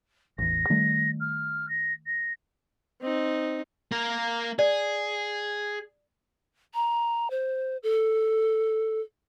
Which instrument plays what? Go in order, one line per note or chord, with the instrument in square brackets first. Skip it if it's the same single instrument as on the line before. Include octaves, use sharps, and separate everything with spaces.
[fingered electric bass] A1 E2 [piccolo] A#6
[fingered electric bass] D#3 G3 A3
[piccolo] F6
A#6
A#6
[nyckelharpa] C4 D#4
[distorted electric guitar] A#3 A#4
[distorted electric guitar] G#4 [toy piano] D5
[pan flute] A#5
C5
A4